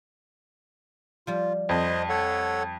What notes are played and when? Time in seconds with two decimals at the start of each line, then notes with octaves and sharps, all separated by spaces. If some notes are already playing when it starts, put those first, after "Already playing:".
1.27 F3 G3 F4
1.69 F2 C5 D#5
2.09 A4 C#5 F#5